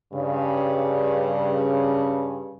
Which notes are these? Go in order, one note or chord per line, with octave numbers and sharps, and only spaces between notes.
G2 C#3